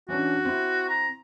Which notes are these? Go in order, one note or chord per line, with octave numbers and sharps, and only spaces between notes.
E3 C#4 D4 F#4
C4 E4
A#5